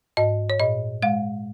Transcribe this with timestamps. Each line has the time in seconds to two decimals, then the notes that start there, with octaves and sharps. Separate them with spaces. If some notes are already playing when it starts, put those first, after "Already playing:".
0.17 G#2 D#5
0.50 C#5
0.60 A#2 D#5
1.02 G#3 F5